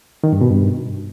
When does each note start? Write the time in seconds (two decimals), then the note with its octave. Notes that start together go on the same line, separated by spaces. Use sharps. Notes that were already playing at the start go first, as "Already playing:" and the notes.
0.24 D#3
0.32 G2
0.41 B2
0.50 G2